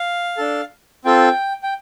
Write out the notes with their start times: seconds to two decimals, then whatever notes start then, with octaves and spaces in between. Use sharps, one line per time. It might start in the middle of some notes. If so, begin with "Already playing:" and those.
Already playing: F5
0.37 D4 A4
1.05 C4 F4 A4 G5
1.63 G5